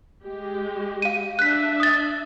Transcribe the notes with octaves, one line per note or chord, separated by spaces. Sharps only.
G#3 G4
F5 D#7
D4 E5 F#6 B6
D#6 A6